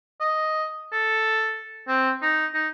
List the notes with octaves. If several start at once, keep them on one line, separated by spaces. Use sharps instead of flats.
D#5
A4
C4
D#4
D#4